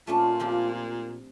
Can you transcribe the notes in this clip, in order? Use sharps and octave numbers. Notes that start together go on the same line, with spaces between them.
A#2 A3 C#4 D4 F4
F3 C4 G4